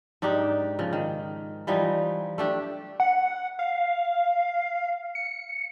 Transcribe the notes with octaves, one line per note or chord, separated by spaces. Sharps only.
G#2 D4 D#4 G4
C#3 F3
D#3
E3 F3 G3 D#4
A3 D4 G4
F#5
F5
C#7